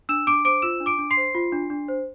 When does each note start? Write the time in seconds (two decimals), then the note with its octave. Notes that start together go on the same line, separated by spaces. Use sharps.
0.09 D4 E6 E7
0.27 D4 D6 D7
0.45 C5 D6 D7
0.62 F4 E6 E7
0.80 D4
0.86 D6 D7
0.98 D4
1.11 C6 C7
1.17 C5
1.35 F4
1.52 D4
1.70 D4
1.89 C5